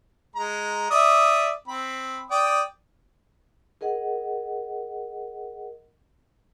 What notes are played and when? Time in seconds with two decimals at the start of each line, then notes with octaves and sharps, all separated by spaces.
0.35 G#3 A#5
0.91 D5 E5 D#6
1.68 C4 B5
2.31 D5 G5 D#6
3.81 G#4 A#4 D#5 F#5